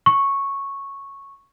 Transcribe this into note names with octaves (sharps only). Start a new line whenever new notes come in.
C#6